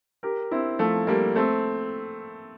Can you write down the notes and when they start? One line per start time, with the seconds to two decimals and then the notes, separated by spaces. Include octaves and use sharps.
0.23 G4 A#4
0.51 C4 E4
0.79 F3 A3
1.07 G3 A#3
1.36 A3 C4